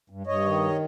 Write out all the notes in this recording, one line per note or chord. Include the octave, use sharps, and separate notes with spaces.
G2
G2 C#5 D#5
D#3